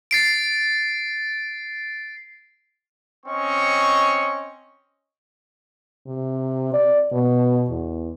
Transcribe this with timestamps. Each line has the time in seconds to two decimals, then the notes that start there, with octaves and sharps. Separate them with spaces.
0.11 A6 C7 D7
3.26 C4 C#4 D#5 C#6
6.07 C3
6.73 D5
7.12 B2
7.69 E2